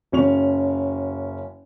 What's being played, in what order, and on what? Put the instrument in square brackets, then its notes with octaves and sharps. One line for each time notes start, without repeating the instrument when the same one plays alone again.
[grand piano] F#1 C#4 C#6 F7